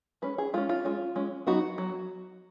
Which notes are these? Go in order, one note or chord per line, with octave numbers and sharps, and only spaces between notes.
G#3 C#4 B4
G#4
G#3 C#4 F4
F4
G#3 C#4
G#3 C#4
F#3 B3 D#4 F#4
F#3